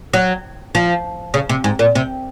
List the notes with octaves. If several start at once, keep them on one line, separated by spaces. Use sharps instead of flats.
F#3
F3
C#3
C3
G#2
A#2
C3